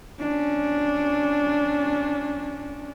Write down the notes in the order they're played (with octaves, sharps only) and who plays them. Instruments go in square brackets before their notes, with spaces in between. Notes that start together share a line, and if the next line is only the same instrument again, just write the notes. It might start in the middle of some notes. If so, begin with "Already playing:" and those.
[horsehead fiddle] C#4 D4